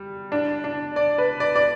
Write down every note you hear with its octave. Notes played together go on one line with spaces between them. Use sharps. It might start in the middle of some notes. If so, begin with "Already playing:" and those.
Already playing: G3
D4
D4
D5
B4
D5
D5